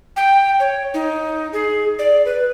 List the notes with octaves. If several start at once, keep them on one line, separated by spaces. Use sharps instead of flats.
G5
C#5
D#4
G#4
D5
B4